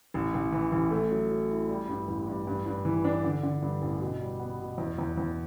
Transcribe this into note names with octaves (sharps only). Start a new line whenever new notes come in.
A1
A1
E3
A1
A3
F#3
F#3
E4
G3
G2
A1
G2
G2
G2
E3
D4
D3
D3
G2
A1
B2
G3
B3
B2
E2
E2
E2